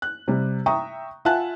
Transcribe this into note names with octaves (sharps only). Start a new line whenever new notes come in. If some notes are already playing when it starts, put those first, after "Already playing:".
F#6
C3 G3
E5 G5 A#5 C#6 D#6
F4 E5 F#5 G#5 A5 F#6